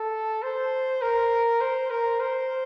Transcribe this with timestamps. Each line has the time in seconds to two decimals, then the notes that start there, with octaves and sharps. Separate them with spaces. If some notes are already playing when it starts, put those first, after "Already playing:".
Already playing: A4
0.43 C5
1.02 A#4
1.61 C5
1.91 A#4
2.20 C5